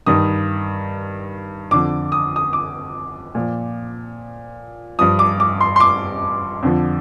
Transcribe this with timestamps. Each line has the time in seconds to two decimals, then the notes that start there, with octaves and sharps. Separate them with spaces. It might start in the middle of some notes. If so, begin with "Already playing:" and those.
0.06 G2 D#3 D#6
1.71 F2 D3 F3 D6
2.12 D#6
2.36 D#6
2.53 D6
3.35 A#2 F3
4.99 G2 F3 D#6
5.19 D6
5.40 D6
5.61 C6
5.76 C6
5.80 D6
6.62 F2 D3 F3